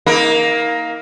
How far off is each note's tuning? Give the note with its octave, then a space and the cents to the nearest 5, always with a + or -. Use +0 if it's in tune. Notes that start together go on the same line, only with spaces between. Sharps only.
A#3 +10 D#4 +35 A#4 +15